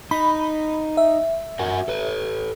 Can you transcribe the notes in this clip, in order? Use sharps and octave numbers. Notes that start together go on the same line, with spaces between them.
D#4 B5
E5
F#4 A#4 F#5
A4 B4